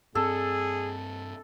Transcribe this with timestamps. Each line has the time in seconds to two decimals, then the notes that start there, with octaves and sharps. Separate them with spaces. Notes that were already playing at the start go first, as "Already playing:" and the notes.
0.15 G2 C4 G#4 A4